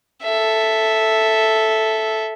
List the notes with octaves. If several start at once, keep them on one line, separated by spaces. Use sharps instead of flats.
A4 E5